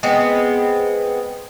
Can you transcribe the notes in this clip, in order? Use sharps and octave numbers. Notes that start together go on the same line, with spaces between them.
G#3 B3 C4